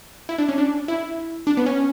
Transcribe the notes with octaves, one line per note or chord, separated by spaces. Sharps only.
E4
D4
C#4
D4
E4
D4
B3
C#4